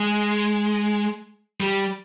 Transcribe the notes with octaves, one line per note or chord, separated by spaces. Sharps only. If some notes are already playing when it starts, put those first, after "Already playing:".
Already playing: G#3
G3